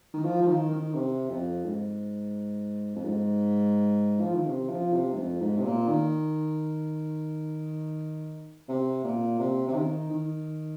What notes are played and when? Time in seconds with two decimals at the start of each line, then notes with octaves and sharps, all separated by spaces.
0.14 D#3
0.24 F3
0.42 F3
0.47 D#3
0.71 D#3
0.95 C3
1.30 F2
1.65 G#2
2.96 F2
3.05 G#2
4.20 F3
4.34 D#3
4.46 C3
4.70 F3
4.93 C3
5.12 G#2
5.16 F2
5.41 G#2
5.57 C3
5.64 A#2
5.88 D#3
8.69 C3
9.04 A#2
9.39 C3
9.68 C3
9.75 D#3
10.10 D#3